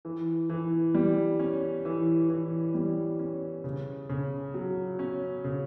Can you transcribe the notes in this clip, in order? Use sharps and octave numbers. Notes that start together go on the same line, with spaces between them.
E3
E3
G3
C#4
E3
E3
G3
C#4
C#3
C#3
F#3
C#4
C#3